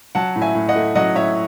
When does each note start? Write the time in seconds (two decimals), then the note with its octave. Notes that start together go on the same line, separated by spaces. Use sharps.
0.15 F#3 F#5 A5
0.36 A2
0.42 E5 G#5
0.55 A2
0.69 D#5 F#5
0.76 A3
0.95 F#3 D#5 F#5
1.15 A2 C#5 E5